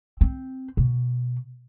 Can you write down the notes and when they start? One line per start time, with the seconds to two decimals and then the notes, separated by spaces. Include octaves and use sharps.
0.21 C4
0.77 B2